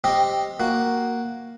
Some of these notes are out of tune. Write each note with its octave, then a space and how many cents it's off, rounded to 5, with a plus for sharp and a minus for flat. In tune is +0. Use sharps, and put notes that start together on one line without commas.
C4 +10 G4 +0 D#5 +0
A#3 +0 F#4 +0